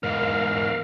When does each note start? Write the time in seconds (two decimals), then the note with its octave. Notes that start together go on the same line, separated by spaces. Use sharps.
0.03 E2 G#2 A#4 F5